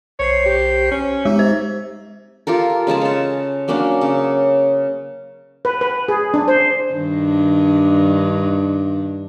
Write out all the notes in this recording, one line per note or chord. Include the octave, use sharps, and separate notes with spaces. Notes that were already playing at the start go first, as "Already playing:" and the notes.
B1 C5 C#5 C7
G4
C#4
G#3 D#4 G4 E5
C5
F4 G4 A4 A#4
C#3 G#3 G#4 A5
C#5 A5
F#3 A#3 C#4 D4
C#3
B4
B4
G#4
D4
C5
G2 D#3 D4